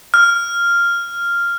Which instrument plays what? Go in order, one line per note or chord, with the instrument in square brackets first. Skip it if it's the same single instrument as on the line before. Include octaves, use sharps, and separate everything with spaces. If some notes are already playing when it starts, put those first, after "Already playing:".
[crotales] F6